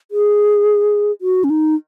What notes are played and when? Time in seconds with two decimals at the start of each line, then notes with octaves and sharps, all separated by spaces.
0.11 G#4
1.21 F#4
1.44 C#4
1.50 D#4